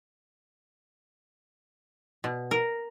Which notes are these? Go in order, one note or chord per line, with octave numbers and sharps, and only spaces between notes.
B2
A#4